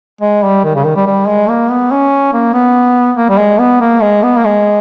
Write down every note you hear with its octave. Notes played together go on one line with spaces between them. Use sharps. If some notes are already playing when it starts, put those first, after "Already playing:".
G#3
G3
D#3
C#3
D#3
G3
G3
G#3
A#3
B3
C#4
A#3
B3
A#3
G3
G#3
B3
A#3
G#3
B3
A#3
G#3